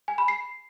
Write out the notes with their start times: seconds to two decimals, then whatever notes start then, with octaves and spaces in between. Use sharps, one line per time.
0.08 G#5
0.18 B5
0.28 C7